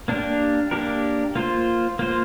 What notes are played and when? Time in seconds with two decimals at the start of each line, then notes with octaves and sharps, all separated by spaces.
0.08 A#3 D4 G4 A#4
0.71 A#3 D4 G4 A#4
1.35 A#3 F4 C5
1.99 A#3 F4 C5